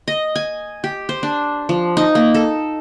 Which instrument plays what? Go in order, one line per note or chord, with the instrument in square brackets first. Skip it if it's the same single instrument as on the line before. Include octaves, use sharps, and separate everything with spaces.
[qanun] D#5
G#5
G4
C5
D4
F3
D#4
A#3
A4